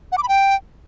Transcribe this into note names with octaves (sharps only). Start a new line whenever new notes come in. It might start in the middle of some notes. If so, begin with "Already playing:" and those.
F#5
D6
B5
G5